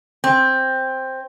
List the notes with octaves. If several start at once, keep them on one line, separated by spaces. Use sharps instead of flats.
C4